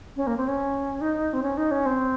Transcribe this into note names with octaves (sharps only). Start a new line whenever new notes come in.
C#4
A#3
C4
C#4
D#4
C4
C#4
D#4
C#4
C4